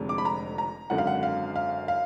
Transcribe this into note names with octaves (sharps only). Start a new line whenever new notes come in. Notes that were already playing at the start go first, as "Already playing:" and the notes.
Already playing: F1 F2 D3 G#3
D6
B5
A#5
A#5
G#1 F#2 D3 F#5
F5
F#5
F5
F5
F5